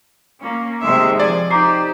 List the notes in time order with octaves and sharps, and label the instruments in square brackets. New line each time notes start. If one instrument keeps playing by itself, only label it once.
[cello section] A#3 C#4
[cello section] C3 D#3 G#3 [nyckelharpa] E5
[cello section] F3 [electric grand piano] D5 [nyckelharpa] G#5
[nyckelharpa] D#4 C5 [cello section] G4 [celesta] A#5 D6 C7